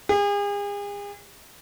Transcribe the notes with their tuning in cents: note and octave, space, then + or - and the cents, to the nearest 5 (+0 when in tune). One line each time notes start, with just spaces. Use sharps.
G#4 -40